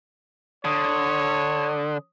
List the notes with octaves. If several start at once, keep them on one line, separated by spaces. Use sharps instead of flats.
D3 C#5 D#6